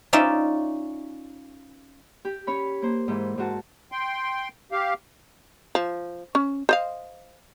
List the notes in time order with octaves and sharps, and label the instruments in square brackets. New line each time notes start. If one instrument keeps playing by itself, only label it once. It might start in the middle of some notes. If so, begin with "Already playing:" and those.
[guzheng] C#4 D#4 F4 D5 E5
[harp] G4
C#4 C#5 B5
A#3 C5
G#2 E3
G#2 F#4 A5
[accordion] G5 C6
G4 F5
[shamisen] F3
C#4
C5 D#5 F5